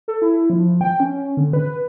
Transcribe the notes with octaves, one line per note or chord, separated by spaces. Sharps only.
A4
E4
F3
G5
C#4
D3
B4